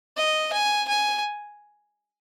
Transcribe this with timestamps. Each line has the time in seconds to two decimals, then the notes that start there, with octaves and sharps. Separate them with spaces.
0.17 D#5
0.53 G#5
0.88 G#5